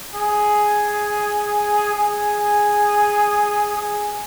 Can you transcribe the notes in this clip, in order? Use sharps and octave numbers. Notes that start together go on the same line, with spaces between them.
G#4
G#4
G#4